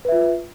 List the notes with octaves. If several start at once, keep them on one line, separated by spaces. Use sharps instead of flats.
F4 B4 E5